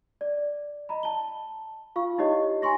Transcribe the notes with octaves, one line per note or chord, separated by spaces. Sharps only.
D5
D#5 A#5 B5
A5 G7
F4 F5 C#6
D#4 E4 G4 C#5 D#5
G#5 A#5 C6 C#6 A#6